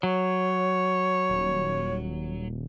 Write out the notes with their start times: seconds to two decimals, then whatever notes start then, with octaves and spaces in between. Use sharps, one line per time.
0.03 F#3 C#5
1.29 D#1